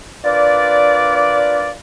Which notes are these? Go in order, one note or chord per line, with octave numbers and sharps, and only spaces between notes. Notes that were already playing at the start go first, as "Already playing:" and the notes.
D4 F4 A#4 B4 D5